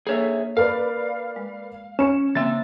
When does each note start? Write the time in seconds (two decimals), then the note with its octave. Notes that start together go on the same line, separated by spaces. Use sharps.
0.07 A#3 D4 G#4 A4 C#5 E5
0.57 A#4 B4 D5 F5
1.36 G#3
1.99 C#4 C#7 E7
2.35 C#3 A#3 C4 D4 E5 A6